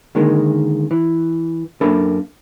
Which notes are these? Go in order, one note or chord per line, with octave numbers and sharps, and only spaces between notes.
D3 D#3 G#3 A#3
E3
F#2 A#3 D4 A4 E5 B5